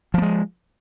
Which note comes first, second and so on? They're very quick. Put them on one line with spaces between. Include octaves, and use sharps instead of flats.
F3 A#3 G#3